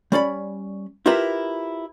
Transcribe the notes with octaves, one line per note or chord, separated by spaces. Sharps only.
G3 C#4 D5 B5
E4 F4 G4 A#4 B4 E5